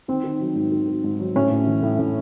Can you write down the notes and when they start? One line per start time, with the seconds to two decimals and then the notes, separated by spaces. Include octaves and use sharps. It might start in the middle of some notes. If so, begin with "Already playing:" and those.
0.08 D#3 C4
0.24 D#3
0.40 F#3
0.55 G#2
0.72 D#3
0.88 D#3
1.04 G#2
1.19 F#3
1.35 A2 C#4
1.51 A2
1.67 E3
1.83 A2
1.99 A2